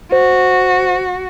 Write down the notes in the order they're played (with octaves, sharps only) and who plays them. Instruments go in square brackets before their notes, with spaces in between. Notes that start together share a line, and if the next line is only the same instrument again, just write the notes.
[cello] F#4 [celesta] C5